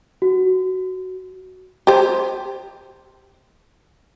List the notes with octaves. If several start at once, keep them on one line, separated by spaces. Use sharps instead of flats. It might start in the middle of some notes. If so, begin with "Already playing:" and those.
F#4
G4 C5